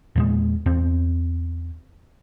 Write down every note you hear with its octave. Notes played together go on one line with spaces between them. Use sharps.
E2 A#2 G#3
E2 C4